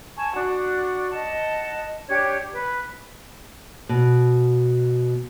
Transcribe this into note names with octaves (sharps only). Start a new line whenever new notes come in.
G#5 A5 C#6
D4 F#4 F#5
D#5 F#5 A5
D4 G4 C#5 G#6
B4
B2